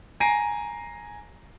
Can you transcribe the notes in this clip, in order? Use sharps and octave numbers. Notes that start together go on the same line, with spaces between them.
G#5 A#5 A#6 C7 D7 D#7